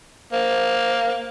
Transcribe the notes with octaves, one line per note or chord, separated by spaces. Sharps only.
A#3 C5